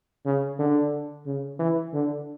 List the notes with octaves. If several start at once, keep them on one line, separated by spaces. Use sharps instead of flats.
C#3
D3
C#3
E3
D3